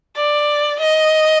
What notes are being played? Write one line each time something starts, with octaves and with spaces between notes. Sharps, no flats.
D5
D#5